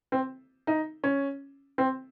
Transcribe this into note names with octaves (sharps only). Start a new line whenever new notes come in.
C4
D#4
C#4
C4